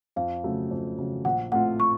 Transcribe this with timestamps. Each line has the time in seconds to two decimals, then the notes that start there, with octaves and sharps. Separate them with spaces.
0.16 F2 F5
0.44 C#3 F#3 A3
0.71 F2
0.98 C#3 F#3 A3
1.25 A#1 F#5
1.52 A2 A3 C4 F4 F#5
1.80 C#6